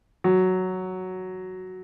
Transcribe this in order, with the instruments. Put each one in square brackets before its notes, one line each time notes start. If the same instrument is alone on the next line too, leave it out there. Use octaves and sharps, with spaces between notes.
[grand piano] F#3